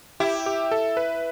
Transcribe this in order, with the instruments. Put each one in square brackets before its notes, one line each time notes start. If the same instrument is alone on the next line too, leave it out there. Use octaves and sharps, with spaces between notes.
[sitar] E4 [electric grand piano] G4
[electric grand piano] G4
A4
B4